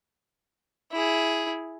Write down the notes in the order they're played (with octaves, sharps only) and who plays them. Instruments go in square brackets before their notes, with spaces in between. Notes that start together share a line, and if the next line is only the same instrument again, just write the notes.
[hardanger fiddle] E4 G#4